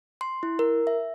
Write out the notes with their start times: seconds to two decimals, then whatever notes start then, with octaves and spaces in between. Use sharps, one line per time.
0.21 C6
0.43 E4
0.59 A#4
0.87 E5